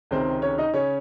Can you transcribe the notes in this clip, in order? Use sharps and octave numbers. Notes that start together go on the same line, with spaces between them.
C#2 C3 D#3 G#3 C4 C5
C#4 C#5
D#4 D#5
C#3 C#4 C#5